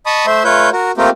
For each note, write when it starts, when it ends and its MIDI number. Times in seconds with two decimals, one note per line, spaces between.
0.06 0.26 75
0.06 0.26 81
0.06 0.26 83
0.06 0.26 85
0.06 0.26 87
0.26 0.43 57
0.26 0.43 72
0.26 0.43 76
0.26 0.43 84
0.44 0.70 57
0.44 0.70 65
0.44 0.70 71
0.44 0.70 73
0.44 0.70 91
0.72 0.92 66
0.72 0.92 70
0.97 1.10 57
0.97 1.10 58
0.97 1.10 60
0.97 1.10 65
0.97 1.10 67
0.97 1.10 70